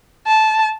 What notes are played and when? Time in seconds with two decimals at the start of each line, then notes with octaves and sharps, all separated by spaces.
0.27 A5